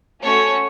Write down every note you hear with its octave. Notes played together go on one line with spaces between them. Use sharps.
A3 C#4 F#4 A4 C#5